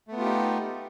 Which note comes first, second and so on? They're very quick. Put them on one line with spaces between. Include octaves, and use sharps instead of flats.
A3 B3 F4 G4 D#4